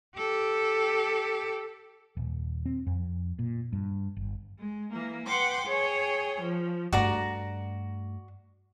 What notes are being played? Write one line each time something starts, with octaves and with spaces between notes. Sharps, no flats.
G4 A4
D#1
C4
F2
A#2
G2
G1
G#3
E3 A#3
B4 F#5 G5 C6 D6
G#4 C#5 G5
F3
G2 A3 F#4 D5 A#5